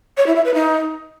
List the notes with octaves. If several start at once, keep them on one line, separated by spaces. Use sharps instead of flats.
C#5
E4
E5
B4
D#4